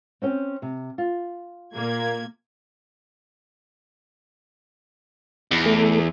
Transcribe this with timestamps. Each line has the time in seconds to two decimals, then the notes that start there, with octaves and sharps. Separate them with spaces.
0.22 C4 C#4 G5
0.62 C3
0.98 F4
1.74 A#2 A#3 G#6
5.51 E2
5.66 A3